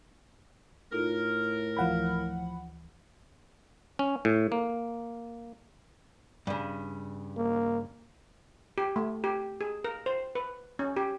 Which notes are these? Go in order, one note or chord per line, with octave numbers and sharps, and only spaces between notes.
A2 D#4 F4 A4 A#4
D2 E3 F3 F5 F#5 B5
C#4
A2
A#3
G2 C#3
A#3
G4
A3
G4
G#4
A#4
C5
B4
C#4
G4